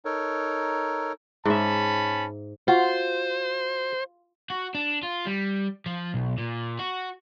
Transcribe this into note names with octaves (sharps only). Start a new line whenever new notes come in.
D#4 A4 A#4 C#5
G#2 C#4 E5 A5 B5
F4 F#4 C5
F#4
D4
F4
G3
F3
B1
A#2
F#4